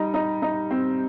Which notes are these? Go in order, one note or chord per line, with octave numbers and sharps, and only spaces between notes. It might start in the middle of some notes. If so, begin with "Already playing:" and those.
Already playing: G3 D#4
D#4
D#4
C4